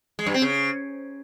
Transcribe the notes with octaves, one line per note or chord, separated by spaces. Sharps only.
G#3
G2
C4
C#3